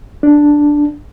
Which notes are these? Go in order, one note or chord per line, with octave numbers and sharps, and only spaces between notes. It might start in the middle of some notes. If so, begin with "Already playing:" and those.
D4